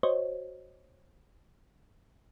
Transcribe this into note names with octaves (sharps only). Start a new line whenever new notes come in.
F#4 C5 C#5 D#5